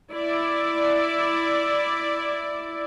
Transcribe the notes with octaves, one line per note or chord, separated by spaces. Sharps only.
E4 D5